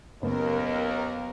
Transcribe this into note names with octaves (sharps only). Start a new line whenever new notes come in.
F#1 D#2 B3 A#4